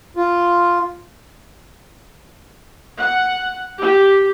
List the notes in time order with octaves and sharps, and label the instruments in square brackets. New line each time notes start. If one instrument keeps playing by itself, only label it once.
[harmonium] F4
[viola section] F#5
G4